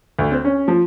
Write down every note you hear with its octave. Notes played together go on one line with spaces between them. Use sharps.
D2
C4
C#4
F3